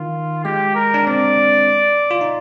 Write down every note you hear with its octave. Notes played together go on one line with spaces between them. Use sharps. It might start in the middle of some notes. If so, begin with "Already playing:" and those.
Already playing: D#3 F4
G#3 G4
A#4
D4
C4 D5
F4
D#4